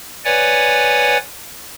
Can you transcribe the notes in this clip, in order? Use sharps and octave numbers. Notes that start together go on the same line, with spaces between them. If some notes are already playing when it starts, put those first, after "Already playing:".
B4 C#5 D5 F#5 G#5